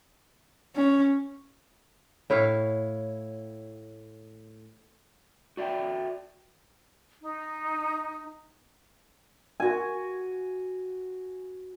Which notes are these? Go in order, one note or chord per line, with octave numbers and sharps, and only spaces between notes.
C#4
A2 E4 C#5 F5
F#4 D5 E5 F5 G5
D#4
F#4 G#5